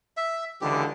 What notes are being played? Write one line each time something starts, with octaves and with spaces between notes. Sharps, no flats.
E5
C#2 D3 E3 G4